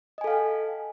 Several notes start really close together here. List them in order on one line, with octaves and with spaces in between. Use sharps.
D#5 G#5 A4 F5 G5